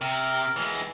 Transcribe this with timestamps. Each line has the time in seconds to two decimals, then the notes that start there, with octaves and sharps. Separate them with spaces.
0.01 C3 A#4
0.56 E3 G#3